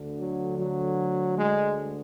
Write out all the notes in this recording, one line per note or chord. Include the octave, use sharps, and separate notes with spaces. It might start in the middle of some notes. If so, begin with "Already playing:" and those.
Already playing: D2 D3
F#3
F#3
G#3